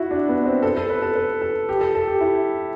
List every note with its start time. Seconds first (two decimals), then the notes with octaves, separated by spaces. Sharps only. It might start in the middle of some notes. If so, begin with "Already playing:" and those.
Already playing: E4 F#4
0.11 D4
0.29 B3
0.46 C4
0.63 A4
0.77 A4
0.90 B4
1.02 A4
1.16 B4
1.42 A4
1.69 G4
1.81 A4
1.95 A4
2.07 G4
2.21 E4